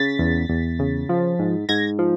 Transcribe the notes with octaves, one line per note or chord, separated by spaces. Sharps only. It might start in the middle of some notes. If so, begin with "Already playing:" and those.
Already playing: C#3 A6 B6
E2
E2
C#3
F3
G#2
G#2 G#6 A#6
F3